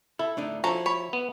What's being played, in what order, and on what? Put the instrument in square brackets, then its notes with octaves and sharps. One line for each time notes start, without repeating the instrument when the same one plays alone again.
[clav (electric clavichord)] E4 [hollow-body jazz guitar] A4
[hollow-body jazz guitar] A3 D4 D#4
[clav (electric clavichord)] F3 [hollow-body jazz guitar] E4 F#4 [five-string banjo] A4 C#5 A#5
[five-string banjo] C#5 B5
[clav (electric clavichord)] B3